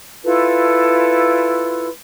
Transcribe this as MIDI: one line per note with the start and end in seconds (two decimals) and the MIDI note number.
0.24 1.87 64
0.24 1.87 65
0.24 1.87 69
0.24 1.87 71